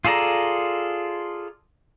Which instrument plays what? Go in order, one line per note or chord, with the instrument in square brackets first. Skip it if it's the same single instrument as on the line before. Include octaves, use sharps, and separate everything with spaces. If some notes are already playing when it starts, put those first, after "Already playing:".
[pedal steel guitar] F4 G#4 A4 D5 A#5